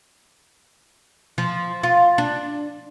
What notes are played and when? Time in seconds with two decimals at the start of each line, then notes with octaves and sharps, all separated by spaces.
1.38 F3
1.83 F4
2.18 D4